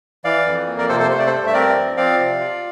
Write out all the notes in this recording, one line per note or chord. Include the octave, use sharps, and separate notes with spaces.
E3 D5 F5
F2
A#3
A#4 D5
C3 A4 C5
A4 C5
A3 C5
D5
A4 C5
G2
E5
C4 A#4 D5
F3
C4 D5 F5
C3
F4